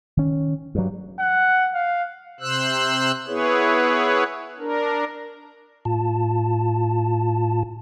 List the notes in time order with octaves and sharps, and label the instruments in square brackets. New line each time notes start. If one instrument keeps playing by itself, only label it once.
[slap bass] D#3 C#4
G2 F#3
[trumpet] F#5
F5
[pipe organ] C3 C5 E6 F#6
B3 E4 G#4 B4 C#5
D4 A#4
[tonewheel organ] A2 F4 A5